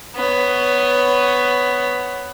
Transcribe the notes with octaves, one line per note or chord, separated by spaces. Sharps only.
B3 C#5